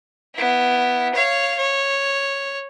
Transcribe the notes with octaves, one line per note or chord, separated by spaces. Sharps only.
B3 E4
C#5 F5
C#5